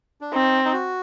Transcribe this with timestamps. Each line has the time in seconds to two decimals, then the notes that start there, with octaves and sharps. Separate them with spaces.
0.21 D4
0.33 C4 D#4
0.65 D#4
0.73 F#4